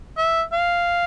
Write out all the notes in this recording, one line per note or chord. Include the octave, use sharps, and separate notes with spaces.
E5
F5